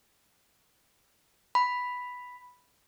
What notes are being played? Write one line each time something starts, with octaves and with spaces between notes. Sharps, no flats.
B5